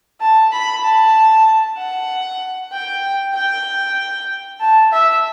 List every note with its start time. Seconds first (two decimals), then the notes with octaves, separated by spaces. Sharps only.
0.21 A5
0.52 B5
0.84 A5
1.78 F#5
2.72 G5
3.34 G5
4.60 A5
4.92 E5